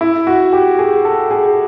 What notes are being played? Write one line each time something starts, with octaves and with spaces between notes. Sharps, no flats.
E4
F#4
G4
G#4
A4
G#4